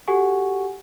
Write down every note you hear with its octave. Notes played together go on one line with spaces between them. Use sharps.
F#4 G4 A4 F#5 G#5 C#6